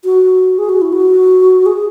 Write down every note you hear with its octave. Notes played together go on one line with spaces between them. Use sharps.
F#4
G#4
F#4
E4
F#4
G#4